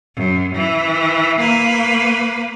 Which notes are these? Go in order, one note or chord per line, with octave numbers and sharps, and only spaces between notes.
F#2
E3
A#3 B4